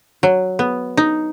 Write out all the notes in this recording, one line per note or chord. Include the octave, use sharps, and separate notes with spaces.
F#3
B3
D#4